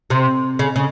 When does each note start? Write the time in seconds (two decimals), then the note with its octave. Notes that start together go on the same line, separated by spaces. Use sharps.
0.10 C3
0.59 C#3
0.76 C#3